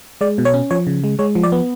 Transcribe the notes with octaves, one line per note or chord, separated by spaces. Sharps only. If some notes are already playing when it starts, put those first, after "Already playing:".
G#3 D5
B2
C#5
C#4
F3 C#5
C#3
G#3
G#3 C#5
F3
D5
B3